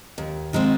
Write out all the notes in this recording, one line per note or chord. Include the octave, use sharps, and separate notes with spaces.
D#2
D#3 G#3 C4 F4